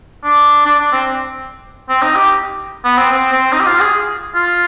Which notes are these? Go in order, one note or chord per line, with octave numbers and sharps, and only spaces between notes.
D4
D4
D4
C4
C4
D#4
G4
B3
C4
C4
C4
D#4
G4
F4
G#4
F4